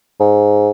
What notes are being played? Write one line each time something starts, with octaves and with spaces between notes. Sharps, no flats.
G#2